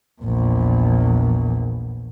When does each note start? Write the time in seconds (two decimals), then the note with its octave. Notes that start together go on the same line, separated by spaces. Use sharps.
0.22 A#1 E2